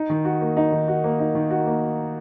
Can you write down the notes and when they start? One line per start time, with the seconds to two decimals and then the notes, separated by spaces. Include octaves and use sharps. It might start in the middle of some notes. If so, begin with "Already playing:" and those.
Already playing: D#4
0.10 D#3
0.25 F#4
0.41 A#3
0.57 D#4
0.72 D#3
0.88 F#4
1.04 A#3
1.19 D#4
1.35 D#3
1.50 F#4
1.66 A#3